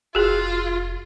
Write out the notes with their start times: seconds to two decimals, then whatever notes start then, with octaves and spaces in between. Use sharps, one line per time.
0.15 F1 F4 F#4 G#4